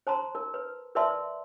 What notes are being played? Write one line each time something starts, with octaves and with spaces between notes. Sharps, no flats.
C5 A5 A#5 C6
A#4
B4
A#4 B4 D5 E5 A5 C6